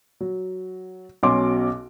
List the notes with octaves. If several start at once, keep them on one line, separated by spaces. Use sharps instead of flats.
F#3
B1 B2 C#4 C6 D6